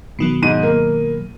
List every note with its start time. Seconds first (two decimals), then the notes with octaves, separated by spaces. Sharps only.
0.19 B2 D#3 F#3
0.42 G#2 D#7
0.63 A#3